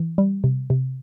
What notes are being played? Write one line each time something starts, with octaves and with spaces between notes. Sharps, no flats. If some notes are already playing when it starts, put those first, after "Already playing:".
Already playing: E3
G3
C3
C3